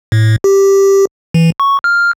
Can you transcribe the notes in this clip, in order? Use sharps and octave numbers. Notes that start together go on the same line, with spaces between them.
A2
G4
E3
C#6
F6